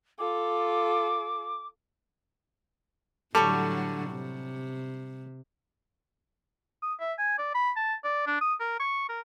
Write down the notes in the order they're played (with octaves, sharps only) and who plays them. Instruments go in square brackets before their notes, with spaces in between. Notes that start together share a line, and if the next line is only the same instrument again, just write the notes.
[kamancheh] F4 A4 [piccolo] D6
[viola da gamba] A2 D3 F#3 [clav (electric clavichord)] G3 [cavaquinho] A4 C#5 C#6
[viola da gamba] C3
[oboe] D#6
E5
G#5
D5
B5
A5
D5
D4
D#6
A#4
C#6
A#4